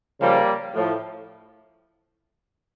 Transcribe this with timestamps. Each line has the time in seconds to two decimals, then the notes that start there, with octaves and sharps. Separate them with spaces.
0.19 C#3 F3 G3 A#3
0.74 A2 F3